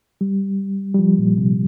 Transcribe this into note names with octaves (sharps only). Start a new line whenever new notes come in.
G3
G3
F3
A#2
C3